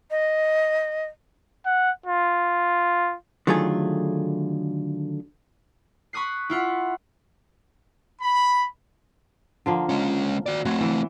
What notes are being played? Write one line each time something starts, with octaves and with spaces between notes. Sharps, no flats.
D#5
F#5
F4
D3 D#3 F#3 A3 F4 G#4
B5 C#6 D#6 F#6 C7
E4 F4 F#5
B5
D3 F3 A#3
G#3 C#4
F#4 D5
A3 C4 F#4 C#5
E3